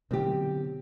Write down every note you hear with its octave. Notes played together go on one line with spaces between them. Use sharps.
B2 D3 F#3 C4 G4